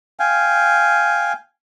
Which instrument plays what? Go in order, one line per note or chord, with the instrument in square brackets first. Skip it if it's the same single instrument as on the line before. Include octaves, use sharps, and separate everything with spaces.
[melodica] F5 G5 G#5